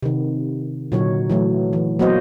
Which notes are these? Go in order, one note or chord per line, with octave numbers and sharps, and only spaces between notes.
C3 D#3
A#2 D3 F#3 D#4 C#5
E3 F#3 A3
E3
F#3 A#3 B3 F#4 C5 D#5